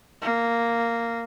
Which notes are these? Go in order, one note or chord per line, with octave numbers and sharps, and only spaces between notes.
A#3